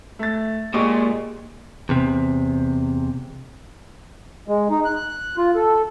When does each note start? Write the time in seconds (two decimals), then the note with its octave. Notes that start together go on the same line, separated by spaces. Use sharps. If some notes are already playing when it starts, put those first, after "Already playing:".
0.19 A3 A6
0.74 A#2 G#3 G4 C#6 D6
1.89 E2 C3
4.48 G#3
4.70 D#4
4.85 F#6
5.37 F4
5.55 A4